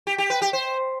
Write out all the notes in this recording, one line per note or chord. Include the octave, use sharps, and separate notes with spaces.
G4
G4
B4
G4
C5